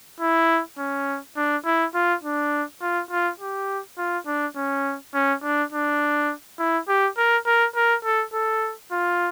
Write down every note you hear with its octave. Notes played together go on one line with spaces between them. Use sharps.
E4
C#4
D4
E4
F4
D4
F4
F4
G4
F4
D4
C#4
C#4
D4
D4
E4
G4
A#4
A#4
A#4
A4
A4
F4